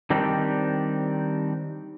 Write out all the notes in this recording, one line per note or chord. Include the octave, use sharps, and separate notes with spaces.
D#3 G3 C4 D4 D#4 G4